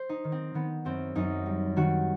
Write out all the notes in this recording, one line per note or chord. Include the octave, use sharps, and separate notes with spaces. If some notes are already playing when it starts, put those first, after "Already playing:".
Already playing: C5
D#4
D#3
C4
D#3 B3
F#2 C4
F#2 D#4
G3
D#3 F#4